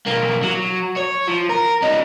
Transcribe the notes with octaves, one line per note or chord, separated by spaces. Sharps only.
B1 A#3
F#3
C#5
F3
A#4
C#4 D#4